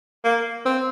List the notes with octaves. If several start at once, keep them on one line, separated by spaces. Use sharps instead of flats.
A#3
C4